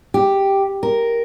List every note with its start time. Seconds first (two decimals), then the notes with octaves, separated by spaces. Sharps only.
0.14 G4
0.83 A#4